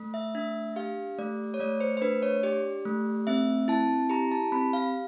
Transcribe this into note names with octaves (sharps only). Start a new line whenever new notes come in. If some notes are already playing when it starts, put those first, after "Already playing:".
Already playing: A3
E5
D4 E5
G4 F5
A3 D5
C#5
A3 D5
C5
C5
D4 B4
C#5
G4 D5
A3
C4 E5
E4 A5
G4 A#5
A5
C4 B5
F5